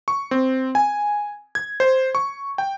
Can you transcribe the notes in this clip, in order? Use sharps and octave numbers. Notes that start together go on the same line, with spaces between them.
C#6
C4
G#5
G#6
C5
C#6
G5